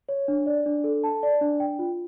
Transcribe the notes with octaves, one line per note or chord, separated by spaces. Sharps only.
C#5
D4
D5
D4
A4
A5
D5
D4
G5
F4